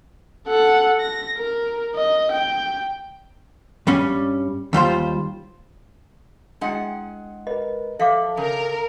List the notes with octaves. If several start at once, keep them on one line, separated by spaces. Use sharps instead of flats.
A4 F#5
A#6
A#4
D#5
G5
G2 G3 C#4
D#2 G3 F4 C5
G#3 D4 E4 G#4 F#5 G5
A#4 B4 D#5
F3 A4 E5 F5 D6
C#3 A#4